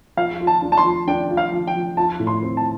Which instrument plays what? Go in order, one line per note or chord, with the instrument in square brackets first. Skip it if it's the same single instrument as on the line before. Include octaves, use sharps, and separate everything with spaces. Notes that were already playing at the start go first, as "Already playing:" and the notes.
[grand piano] F3 [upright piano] F5
[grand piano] F4
[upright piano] A5
[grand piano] D4
[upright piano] A5
C6
[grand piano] F3
[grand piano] D4 [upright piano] G5
[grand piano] F4
[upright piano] F5
[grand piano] F3
[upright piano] G5
[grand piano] F3
[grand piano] F4 [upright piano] A5
[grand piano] A2
[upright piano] C6
[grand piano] C4
[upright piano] A5